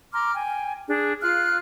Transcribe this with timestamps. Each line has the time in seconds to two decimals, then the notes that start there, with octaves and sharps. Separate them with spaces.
0.13 A#5 C6 D6 F6
0.34 G5 G#5
0.87 D4 G#4
1.22 F4 F5 F6 F#6